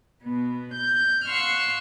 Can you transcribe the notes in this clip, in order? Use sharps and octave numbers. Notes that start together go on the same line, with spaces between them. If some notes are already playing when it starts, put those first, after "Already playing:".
B2 B3
G6
F5 F#5 C6 C#6 E6 F6